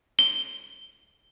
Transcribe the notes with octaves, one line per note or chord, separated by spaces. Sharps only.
G7